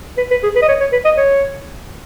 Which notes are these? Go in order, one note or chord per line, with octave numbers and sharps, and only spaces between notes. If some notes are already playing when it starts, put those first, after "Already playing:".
B4
B4
G#4
B4
D#5
C#5
C#5
B4
D#5
C#5